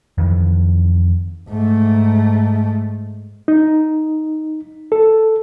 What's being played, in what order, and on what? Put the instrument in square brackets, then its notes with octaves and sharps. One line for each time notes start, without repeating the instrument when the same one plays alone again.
[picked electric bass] F2 D#3 E3
[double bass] G#2 A3
[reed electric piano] D#4
A4